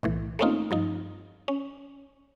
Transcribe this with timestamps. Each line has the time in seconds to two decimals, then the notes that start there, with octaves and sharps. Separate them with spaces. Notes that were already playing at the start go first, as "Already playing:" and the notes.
0.03 B1 A2 E3
0.39 A3 A#3 C4 C#4 D#4 F4
0.71 G2 F3 D#4
1.48 C#4